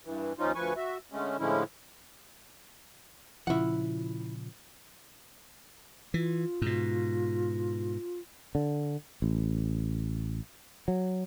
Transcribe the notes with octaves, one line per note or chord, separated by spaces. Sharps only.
G2 E3
D#2 F3 C#4 D#4 F4
D2 F3 B4 G#5 C#6
F#4 E5
D3 G#3 A3 C#4
A2 D3 F3 G#3 C#4 E4
A#2 C#3 F3 E4 F#5
E3 F4
G#2 B2
D3
A1
F#3